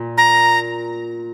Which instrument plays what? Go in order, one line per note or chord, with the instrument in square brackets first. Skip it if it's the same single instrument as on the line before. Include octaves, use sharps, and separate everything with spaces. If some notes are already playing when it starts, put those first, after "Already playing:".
Already playing: [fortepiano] A#2
[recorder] A#5